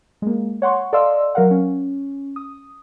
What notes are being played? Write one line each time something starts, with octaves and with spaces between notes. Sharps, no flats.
G#3 A#3
C#5 F#5 C6 C#6
A4 D5 D#5 F5 C6 E6
F#3 A#4 F5 F#5
C#4
D#6